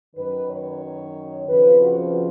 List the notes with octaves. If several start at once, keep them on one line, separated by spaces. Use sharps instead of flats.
F#2 D#3 B4
C#5
F2 C#3 F3 B4
F#4